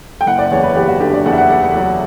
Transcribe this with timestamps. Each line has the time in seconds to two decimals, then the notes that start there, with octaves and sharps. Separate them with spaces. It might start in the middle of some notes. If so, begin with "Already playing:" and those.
0.21 G5
0.26 F#1 F#5
0.39 D5
0.51 E2 C#5
0.63 B4
0.76 E2 G4
0.88 F#4
1.00 D3 G4
1.14 D5
1.26 E2 F#5
1.32 E5
1.38 F#5
1.50 E2 F#5
1.63 F#5
1.75 F#3